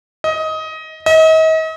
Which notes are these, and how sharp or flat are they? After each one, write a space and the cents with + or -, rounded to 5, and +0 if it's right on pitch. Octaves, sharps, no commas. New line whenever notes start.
D#5 +20
D#5 +40